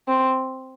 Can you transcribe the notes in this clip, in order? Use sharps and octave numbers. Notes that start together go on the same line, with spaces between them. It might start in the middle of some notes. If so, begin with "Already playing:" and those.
C4